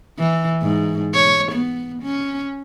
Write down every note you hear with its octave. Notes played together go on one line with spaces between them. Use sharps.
E3
G#2
C#5
B3
C#4